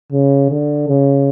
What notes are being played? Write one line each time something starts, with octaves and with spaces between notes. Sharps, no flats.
C#3
D3
C#3